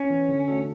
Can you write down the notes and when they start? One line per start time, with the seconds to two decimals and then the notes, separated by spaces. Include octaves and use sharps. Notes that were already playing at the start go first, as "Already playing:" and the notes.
Already playing: C#4
0.10 E3 B3
0.29 D3
0.48 A3 D4 F#4 A4